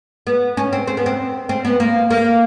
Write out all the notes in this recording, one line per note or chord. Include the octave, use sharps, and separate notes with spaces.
B3
C#4
C4
C4
B3
C4
C4
B3
A#3
A#3